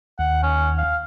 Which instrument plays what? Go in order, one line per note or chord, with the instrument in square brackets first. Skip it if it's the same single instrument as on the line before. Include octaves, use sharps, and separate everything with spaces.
[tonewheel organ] D#2 [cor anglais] F#5
[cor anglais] C#4
F5